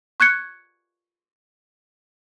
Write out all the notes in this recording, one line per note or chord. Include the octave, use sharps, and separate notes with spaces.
C#6 F#6 G#6 C#7